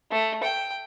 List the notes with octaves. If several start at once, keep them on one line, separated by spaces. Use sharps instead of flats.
A3
G5